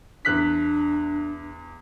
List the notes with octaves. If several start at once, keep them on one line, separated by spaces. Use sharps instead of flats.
E2 D4 F#6 B6